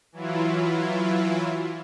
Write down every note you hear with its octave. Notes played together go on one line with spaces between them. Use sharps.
E3 F#3 E4 F4